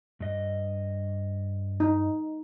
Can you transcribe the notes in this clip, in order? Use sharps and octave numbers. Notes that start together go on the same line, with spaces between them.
G2 D#5
D#4